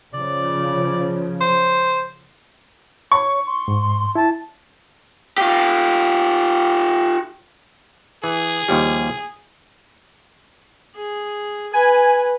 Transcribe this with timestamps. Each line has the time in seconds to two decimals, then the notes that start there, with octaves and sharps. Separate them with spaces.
0.14 C#3 F3 D5
1.41 C5
3.12 C#5 C#6
3.46 C6
3.68 G#2
4.15 E4 A5
5.38 F4 G4
8.24 E3 G#4
8.68 D#2 F3 G3
10.95 G#4
11.73 B4 G#5